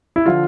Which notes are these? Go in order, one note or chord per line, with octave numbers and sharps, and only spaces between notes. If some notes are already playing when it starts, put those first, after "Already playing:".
E4
D3 F3 F4